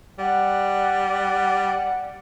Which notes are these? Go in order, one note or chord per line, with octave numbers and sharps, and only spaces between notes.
G3 F#5